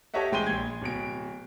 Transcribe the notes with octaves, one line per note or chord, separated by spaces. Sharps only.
G4 A4 C#5 D#5 E5 F#5
A1 G#3 G5 C6 D#7 G7
A#1 G#6
D1 B2 D7